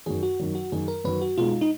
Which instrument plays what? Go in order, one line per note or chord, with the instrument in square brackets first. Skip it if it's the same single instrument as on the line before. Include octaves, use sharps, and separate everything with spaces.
[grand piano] F#2 D#3 F#3 [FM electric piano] G#4
[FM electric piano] F#4
[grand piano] F#2 D#3 F#3
[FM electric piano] F#4
[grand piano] F#2 D#3 F#3 [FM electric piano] G#4
[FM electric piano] A#4
[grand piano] F#2 D#3 F#3 [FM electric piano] B4
[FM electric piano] F#4
[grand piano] B2 G#3 D#4 [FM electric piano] F4
[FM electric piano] D#4